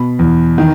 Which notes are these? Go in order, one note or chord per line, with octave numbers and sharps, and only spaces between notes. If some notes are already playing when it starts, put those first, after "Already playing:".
Already playing: B2 B5
E2
D#3